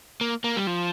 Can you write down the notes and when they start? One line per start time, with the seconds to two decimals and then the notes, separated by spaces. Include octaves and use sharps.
0.21 A#3
0.44 A#3
0.56 G3
0.67 F3